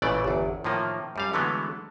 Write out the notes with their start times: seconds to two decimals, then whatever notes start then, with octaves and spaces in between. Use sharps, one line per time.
0.02 A1 A#2 C#3 E3 A3 D5
0.24 G1 E2
0.64 A2 D#3 F3 A#3
1.16 F#2 G3 F5
1.33 D3 E3 F#3 G#3 A3 B3